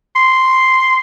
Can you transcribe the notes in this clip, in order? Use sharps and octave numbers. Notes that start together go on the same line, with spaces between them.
C6